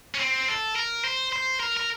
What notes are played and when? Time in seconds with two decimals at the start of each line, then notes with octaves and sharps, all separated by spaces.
0.15 C#4
0.20 C4
0.48 A4
0.76 A#4
1.04 C5
1.33 C5
1.60 A#4
1.77 A#4